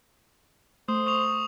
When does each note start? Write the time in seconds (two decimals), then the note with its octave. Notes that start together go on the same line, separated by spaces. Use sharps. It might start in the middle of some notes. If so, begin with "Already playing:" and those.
0.88 A3 C5 D#6
1.06 C#6 D#6 F7